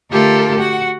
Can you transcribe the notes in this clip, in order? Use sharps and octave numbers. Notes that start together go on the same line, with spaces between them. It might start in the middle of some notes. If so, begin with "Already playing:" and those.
D3 A3 F4 G4 A4 A#4
F#4 F#5